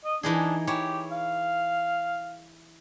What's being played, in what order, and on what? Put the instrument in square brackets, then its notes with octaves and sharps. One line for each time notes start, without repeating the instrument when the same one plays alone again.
[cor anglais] D#5
[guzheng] E3 D#4 G#4 [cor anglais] D4
[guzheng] E3 C#5 [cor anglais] G4
[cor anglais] F5